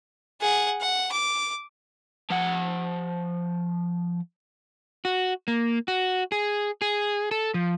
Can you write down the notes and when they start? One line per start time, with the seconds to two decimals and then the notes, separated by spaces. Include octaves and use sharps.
0.41 G#4 F#5
0.81 F#5
1.12 D6
2.30 F3 F#5
5.05 F#4
5.48 A#3
5.88 F#4
6.32 G#4
6.82 G#4
7.31 A4
7.54 F3